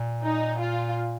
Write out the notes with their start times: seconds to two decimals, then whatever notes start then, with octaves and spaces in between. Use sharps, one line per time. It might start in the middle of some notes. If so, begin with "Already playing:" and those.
Already playing: A#2
0.23 D#4
0.59 F4